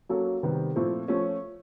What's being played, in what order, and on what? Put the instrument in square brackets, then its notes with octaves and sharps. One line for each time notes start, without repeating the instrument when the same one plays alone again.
[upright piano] F#3 A#3 C#4 F#4 A4
C3 D#3 G3 B3
A#2 F3 A3 C4 E4
F3 A3 C#4